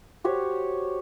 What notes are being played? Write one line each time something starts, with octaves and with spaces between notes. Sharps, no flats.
F#4 G4 C5 C#5